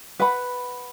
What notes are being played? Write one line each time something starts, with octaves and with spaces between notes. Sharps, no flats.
B4 F#5 B5